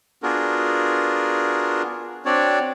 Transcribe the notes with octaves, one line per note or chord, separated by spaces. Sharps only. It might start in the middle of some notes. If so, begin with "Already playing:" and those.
B3 D4 F4 F#4 G#4 A#4
C4 D4 F#4 C#5 D5